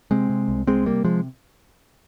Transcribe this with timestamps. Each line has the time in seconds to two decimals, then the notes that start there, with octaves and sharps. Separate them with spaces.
0.11 C3 G#3 C4
0.30 C3
0.48 C2
0.67 C2 G#3 C4
0.85 C3 G3 A#3
1.04 C3 F3 G#3